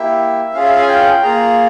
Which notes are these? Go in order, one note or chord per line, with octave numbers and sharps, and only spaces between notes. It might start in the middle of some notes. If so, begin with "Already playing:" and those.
Already playing: A#3 E4 G4 E5
C#4 F4 G#4 F5
E5
F5
G#5
G5
A#3 F4 G#4 A#5